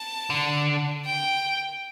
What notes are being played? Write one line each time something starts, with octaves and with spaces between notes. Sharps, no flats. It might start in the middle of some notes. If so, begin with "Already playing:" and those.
Already playing: A5
D3
G5